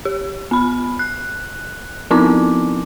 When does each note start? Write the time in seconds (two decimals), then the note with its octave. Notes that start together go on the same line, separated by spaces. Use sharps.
0.05 G4
0.51 B3 B5
0.99 F#6
2.11 F3 B3 C4 D#4 E4 D6